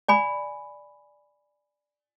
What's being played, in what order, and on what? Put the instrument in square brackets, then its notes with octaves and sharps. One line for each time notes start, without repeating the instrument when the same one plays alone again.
[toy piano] D5 G#5 B5